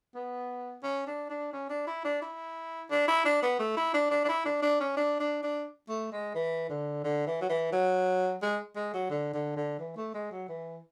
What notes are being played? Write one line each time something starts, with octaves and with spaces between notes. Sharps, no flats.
B3
C#4
D4
D4
C#4
D4
E4
D4
E4
D4
E4
D4
B3
A3
E4
D4
D4
D4
E4
D4
D4
C#4
D4
D4
D4
A3
G#3
E3
D3
D3
E3
F#3
E3
F#3
G#3
G#3
F#3
D3
D3
D3
E3
A3
G#3
F#3
E3